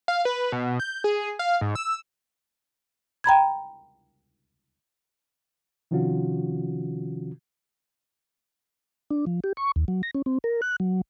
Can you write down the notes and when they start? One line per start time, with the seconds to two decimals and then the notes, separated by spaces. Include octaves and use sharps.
0.08 F5
0.25 B4
0.52 B2
0.80 G6
1.04 G#4
1.39 F5
1.61 G#2
1.75 E6
3.24 G5 A#5 B5 G#6
5.91 C3 D#3 F3 C#4 F4 F#4
9.10 D4
9.26 F3
9.44 G4
9.57 C#6
9.76 D#2
9.88 F#3
10.03 A#6
10.15 C#4
10.26 C4
10.44 A#4
10.62 F#6
10.80 F#3